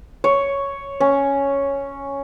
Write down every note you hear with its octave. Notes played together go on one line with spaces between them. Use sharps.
C#5
C#4